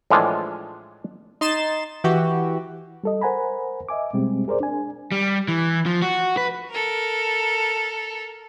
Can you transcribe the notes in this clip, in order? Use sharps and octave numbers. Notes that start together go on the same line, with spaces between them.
A2 E3 F3 G#3 D4 F4
D#4 C6 A6 E7
E3 F#4 G4
G3 A4 D#5
A#4 C5 F#5 G#5 A#5 B5
D#5 E5 G#5 D6
B2 G3 G#3 C4 G4
G#4 A#4 C5 D5
D4 G#5
G3
E3
F3
F#4
B4
A4 A#4